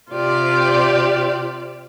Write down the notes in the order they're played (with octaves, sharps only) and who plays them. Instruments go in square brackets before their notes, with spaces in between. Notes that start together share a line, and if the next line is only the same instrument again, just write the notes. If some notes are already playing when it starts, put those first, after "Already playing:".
[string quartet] C3 F4 G4 D5